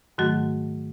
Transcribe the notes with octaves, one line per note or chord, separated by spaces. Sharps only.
G#2 D#3 F#3 A3 F#4